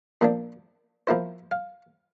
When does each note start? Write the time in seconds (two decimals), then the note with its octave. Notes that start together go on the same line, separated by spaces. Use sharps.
0.21 A#2 F3 A#3 D4
1.07 F3 A#3 E4 C5
1.51 F5